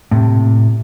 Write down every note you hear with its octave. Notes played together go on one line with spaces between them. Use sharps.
A2 C3